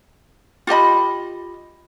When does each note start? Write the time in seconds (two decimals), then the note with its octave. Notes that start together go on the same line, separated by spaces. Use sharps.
0.67 F4 G4 D#5 B5